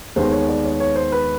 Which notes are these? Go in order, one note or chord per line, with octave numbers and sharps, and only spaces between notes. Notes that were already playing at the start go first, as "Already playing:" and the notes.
D#2 D#3 G#3 B3 C5
C#5
D5
C#5
C#5
C5
B4